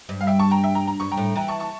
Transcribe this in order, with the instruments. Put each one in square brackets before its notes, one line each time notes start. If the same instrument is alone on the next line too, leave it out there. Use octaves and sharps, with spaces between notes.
[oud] G2
[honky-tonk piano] F5
E5 G5
A5 C#6
G5 A#5
E5 G5
G5 A#5
A#5
[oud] G2 [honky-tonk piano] C#6
[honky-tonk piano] G5 A#5
[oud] A2
[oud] E3 [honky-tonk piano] G5 A#5
[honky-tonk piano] A5 C#6
A5 C#6